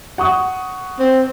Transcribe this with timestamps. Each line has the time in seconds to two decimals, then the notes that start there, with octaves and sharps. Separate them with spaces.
0.18 F#5 C#6 D#6
0.99 C4